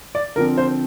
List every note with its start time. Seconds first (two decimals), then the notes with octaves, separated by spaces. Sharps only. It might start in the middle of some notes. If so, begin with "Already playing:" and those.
0.15 D5
0.36 D3 F3 C4 A#4
0.57 C5